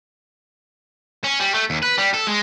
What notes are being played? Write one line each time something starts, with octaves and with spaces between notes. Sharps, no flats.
C#4
G3
A3
D#2
B4
G3
A4
G#3